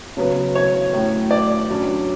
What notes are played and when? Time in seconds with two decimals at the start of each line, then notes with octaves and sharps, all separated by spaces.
0.17 C#3 F#3 B3
0.55 C#5
0.93 A2 F#3 C#4
1.31 D5
1.69 G2 F#3 C#4